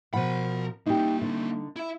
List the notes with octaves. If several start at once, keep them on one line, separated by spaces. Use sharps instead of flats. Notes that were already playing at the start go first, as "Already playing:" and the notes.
B2 F3 A#4 F#5 B5
G3 A#3 D#4 G4
D3 D#4
E4 E5